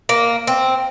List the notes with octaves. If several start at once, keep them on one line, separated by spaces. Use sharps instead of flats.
A#3
C4